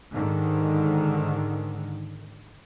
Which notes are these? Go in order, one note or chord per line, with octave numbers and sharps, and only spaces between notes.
G#2 D3 D#3